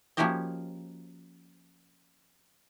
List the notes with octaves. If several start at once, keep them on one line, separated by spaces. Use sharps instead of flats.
F3 A#3 C#4 F#4 G4 D#5